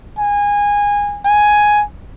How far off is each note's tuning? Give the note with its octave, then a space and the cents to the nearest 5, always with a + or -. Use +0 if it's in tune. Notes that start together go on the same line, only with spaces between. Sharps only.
G#5 -20
G#5 +5